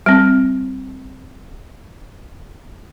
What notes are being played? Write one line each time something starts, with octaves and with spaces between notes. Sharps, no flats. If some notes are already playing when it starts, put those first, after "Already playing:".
G3 C4